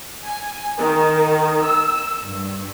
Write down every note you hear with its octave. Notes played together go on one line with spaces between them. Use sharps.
G#5
D#3
E6
G2